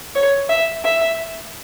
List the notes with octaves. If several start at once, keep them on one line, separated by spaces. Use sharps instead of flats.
C#5
E5
E5